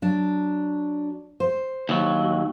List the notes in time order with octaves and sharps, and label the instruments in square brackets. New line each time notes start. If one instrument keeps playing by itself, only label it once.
[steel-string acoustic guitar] F#3 D4
C5
[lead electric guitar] D#2 F#3